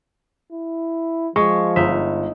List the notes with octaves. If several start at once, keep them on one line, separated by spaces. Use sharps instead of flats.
E4
F3 G#3 C#6
G1 D#4 E5